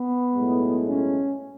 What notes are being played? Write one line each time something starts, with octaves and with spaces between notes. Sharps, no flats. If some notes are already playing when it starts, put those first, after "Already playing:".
Already playing: B3
B1 A2 G#3
C#4